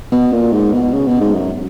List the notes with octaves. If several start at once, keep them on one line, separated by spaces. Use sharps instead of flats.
B2
A#2
G#2
B2
C#3
B2
G#2
F#2